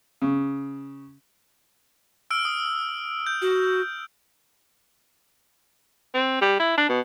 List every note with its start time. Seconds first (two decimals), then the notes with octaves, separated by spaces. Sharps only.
0.22 C#3
2.31 E6 F6 D7
2.45 D#6
3.27 G6
3.42 F#4
6.14 C4
6.41 G3
6.60 E4
6.77 D4
6.89 B2